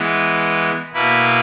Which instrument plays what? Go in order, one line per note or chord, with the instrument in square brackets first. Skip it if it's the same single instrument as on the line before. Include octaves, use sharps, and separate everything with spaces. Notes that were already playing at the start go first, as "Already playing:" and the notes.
Already playing: [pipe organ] E3 G#3 B3
B2 A#3 E4 B4